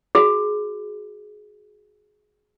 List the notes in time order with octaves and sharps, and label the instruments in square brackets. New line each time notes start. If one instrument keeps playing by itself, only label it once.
[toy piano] F#4 G#4